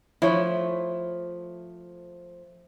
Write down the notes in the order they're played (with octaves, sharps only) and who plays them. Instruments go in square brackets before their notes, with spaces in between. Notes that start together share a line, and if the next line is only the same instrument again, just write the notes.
[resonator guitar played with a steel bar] F3 A3 [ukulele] E4 C#5